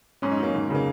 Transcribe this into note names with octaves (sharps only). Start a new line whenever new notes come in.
G#2 C#4
D#4
F#3 A#3 C#4
G#2 D#3
C#3 F#3 A#3